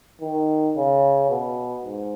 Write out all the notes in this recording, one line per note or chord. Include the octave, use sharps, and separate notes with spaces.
D#3
C#3
B2
G#2